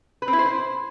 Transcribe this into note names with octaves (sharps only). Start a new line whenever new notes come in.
B4
C4
E4
C5